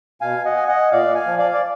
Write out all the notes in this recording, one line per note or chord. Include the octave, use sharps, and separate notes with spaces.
B2 F5 G#5
D#5 F#5
G#5
D#5 F#5
A#2 D5 F5
F5 G#5
F3
D5 F5
D5